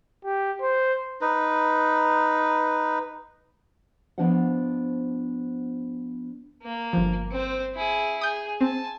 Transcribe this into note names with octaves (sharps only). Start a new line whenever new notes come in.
G4
C5
D#4 B4
F3 B3 D4 C5 D#5 F#5
A#3
G1 F3
C4 C5
E4 G#4
G#4 D#6 G6
C4 G#5 A5